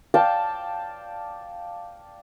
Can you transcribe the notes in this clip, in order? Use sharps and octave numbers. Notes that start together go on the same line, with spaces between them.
D5 F5 G5 A5